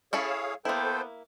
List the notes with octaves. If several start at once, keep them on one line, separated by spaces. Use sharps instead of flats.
C#4 E4 G#4 A4 C#5 F5
A#3 B3 E4 A4 C5 G5